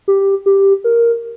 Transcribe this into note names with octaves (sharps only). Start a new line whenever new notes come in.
G4
G4
A#4